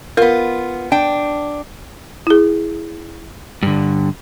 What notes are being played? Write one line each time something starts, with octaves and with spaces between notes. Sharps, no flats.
B3 F4 A#4
D4 G5
E4 G#4
G2 D3